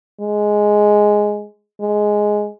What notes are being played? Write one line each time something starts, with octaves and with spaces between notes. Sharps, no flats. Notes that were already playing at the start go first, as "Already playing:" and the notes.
G#3
G#3